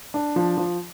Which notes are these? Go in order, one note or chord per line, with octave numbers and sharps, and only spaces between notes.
D4
F3
F3